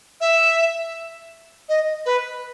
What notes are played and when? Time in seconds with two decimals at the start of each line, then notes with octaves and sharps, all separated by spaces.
0.20 E5
1.68 D#5
2.05 B4